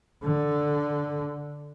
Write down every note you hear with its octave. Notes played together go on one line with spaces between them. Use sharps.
D3